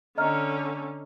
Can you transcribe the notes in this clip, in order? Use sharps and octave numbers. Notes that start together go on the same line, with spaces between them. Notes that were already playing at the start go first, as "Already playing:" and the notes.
D3 C#4 D#5 A#5 F6